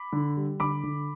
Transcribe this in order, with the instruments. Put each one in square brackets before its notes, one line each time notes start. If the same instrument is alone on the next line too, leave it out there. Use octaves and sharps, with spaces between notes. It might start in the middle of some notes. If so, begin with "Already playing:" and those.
Already playing: [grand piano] B5 D6
D3
G3
D3 B5 D6
D3